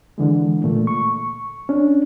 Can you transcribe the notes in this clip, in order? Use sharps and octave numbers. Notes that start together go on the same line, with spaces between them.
D3 E3 G#3
A#2 A3
C#6
C#4 D4